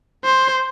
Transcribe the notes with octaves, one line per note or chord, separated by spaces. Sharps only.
C5